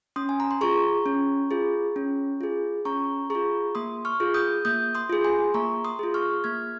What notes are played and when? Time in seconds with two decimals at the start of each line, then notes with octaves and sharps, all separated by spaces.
0.16 C#4 C6 D#6
0.29 G#5
0.40 A#5
0.51 C6
0.61 F4 G#4 A#5 C#6
1.06 C#4
1.51 F4 G#4
1.96 C#4
2.41 F4 G#4
2.85 C#4 A#5 C#6
3.30 F4 G#4 A#5 C#6
3.75 A#3 C6 D#6
4.05 C#6 F6
4.20 F4 G#4
4.34 D#6 G6
4.65 A#3 D#6 G6
4.95 C6 D#6
5.10 F4 G#4
5.24 G#5 C6
5.54 A#3 A#5 C#6
5.85 C6 D#6
5.99 F4 G#4
6.14 C#6 F6
6.44 A#3 F6 G#6